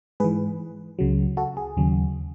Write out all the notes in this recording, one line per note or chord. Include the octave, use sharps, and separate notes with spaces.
G#2 E3 G#4 B4
C#2 C#3 F#3
F#4 A4
G#4
D#2 C#3 F#3